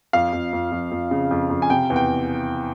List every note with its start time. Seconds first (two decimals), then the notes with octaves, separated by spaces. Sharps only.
0.13 F2 F5
0.33 F2
0.53 F2
0.71 F2
0.91 F2
1.11 C#3
1.31 F2
1.50 F2
1.62 G#5
1.70 C3 G5
1.90 E2
1.96 G5